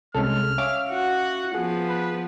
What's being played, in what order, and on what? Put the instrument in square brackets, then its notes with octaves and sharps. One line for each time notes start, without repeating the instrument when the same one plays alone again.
[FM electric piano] C2 [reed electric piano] G#3 C#4 A4 [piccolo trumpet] F6
[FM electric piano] C#4 D6 [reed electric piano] E5 F5
[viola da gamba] F#4 [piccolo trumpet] F#5
[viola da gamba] F3 B3 [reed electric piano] G#4
[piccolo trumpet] B4